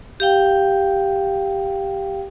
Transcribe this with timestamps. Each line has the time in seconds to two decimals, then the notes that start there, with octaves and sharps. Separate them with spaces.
0.20 G4 F5 G5